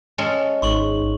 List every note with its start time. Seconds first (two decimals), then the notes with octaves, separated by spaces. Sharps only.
0.18 G#3 C#4 A4
0.62 G#1 G#2 C6 C#6 F#7